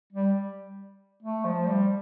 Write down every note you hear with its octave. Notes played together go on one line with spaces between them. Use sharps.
G3
A3
F3
G3